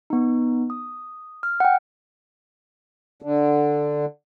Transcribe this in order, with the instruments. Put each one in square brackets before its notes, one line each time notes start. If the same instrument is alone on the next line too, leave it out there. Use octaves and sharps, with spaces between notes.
[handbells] B3 D#4
D#6
F6
F#5 G5
[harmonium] D3